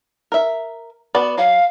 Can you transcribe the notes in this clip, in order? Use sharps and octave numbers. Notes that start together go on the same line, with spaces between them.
A#4 E5
B3 F#4 D5
F#3 F5